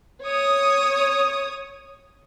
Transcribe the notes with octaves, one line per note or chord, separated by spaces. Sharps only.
C#5 D#6